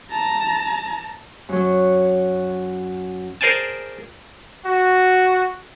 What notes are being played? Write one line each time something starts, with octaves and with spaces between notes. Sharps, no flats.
A5 A#5
F#2 F#3
G#4 A#4 C5 D5 G#5 A5
F#4